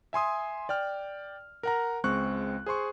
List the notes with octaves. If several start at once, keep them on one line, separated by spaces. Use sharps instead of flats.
E5 G#5 C6 D#6
D5 G5 F6
A#4 F#5 A#5
C#2 G#3 C4 C#6 F#6
G#4 C5 C6 C#6